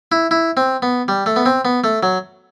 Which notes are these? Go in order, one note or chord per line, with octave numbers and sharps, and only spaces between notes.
E4
E4
C4
B3
G3
A3
B3
C4
B3
A3
F#3